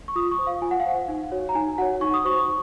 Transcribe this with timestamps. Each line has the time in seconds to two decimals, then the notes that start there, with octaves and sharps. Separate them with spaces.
0.08 C#6
0.16 F4 D#6
0.31 C#6
0.38 C5
0.47 F5
0.62 F4 G#5
0.71 F#5
0.80 F5
0.86 C5 F#5
1.08 D#4
1.31 F#4 C#5
1.49 A#5
1.55 D#4 G#5
1.78 F#4 F#5
1.82 C#5
2.01 D#4 C#6
2.14 D#6
2.24 F#4 C5 C#6